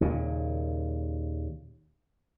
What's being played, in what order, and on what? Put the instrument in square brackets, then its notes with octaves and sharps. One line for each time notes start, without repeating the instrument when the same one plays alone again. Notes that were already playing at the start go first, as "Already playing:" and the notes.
[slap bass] D#2 A#2 C#3